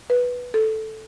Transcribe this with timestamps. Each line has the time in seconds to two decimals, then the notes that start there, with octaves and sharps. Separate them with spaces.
0.10 B4
0.54 A4